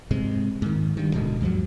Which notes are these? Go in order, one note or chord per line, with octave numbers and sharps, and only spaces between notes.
G#2 C3 G#3
G#2 D#3
G2 D#3
D1 B2 D3 G#3
D2 G2 F3 F#3